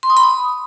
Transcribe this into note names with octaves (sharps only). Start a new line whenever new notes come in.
C6
D#6
B5
D#6